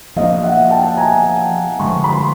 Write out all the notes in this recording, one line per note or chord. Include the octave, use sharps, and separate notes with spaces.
F3 A#3 D4 D#5 F5
E5 F#5
G5 A5
G#5 A#5
D3 F3 G#3 B5 C#6
B5
C6